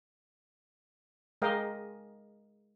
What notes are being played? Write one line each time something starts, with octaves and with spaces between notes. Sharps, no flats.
G#3 A#4 D#5 F5 G5